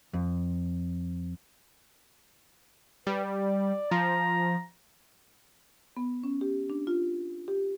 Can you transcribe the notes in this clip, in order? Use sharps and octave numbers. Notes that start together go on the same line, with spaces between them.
F2
G3 B4
D5
F3 A#5
B3
C#4
G4
D4
F4
G4